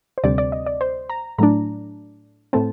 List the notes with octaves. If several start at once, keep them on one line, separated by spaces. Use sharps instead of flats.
C5
D2 C3 G3 C4 D5
D5
D#5
D5
C5
A#5
A2 F#3 A3 D4 A#5
A2 A3 C4 A5